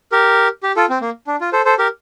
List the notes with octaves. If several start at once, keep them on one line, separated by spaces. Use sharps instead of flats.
G4 A#4
G4
F4 A4
C4
A#3
D4
F4
A4 C5
A4 C5
G4 A#4